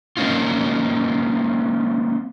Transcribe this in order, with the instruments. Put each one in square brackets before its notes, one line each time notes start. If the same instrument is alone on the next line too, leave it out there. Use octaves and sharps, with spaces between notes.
[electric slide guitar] F#3 A#3 C4 C#4 D#4 F4